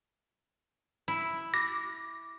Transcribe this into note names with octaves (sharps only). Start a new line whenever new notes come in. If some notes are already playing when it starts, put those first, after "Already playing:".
E4
D6 A#6